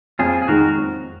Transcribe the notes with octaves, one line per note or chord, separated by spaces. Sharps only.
F2 F4 G#4
G#4
D#3 G#3 D#4 F#4 A#4
F2